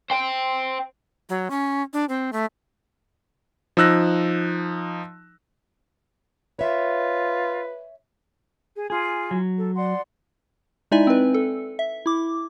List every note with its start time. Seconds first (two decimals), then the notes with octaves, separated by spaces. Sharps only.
0.10 C5 G5
1.29 F#3
1.50 C#4
1.93 D4
2.09 C4
2.32 A3
3.77 F3 D#4 E6 F#6 A#6
6.59 F4 B4 C#5 E5
8.74 G#4
8.90 F4 G#4 G#5
9.31 F#3
9.57 A4
9.75 D5 F#5 C6
10.91 G#3 D#4 E4 D5 E5 G#5
11.07 C4 B4
11.34 A4
11.79 E5
12.06 E4 D6